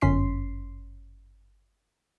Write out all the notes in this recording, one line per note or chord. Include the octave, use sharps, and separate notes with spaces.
G1 F#2 C#4 C6 B6 C7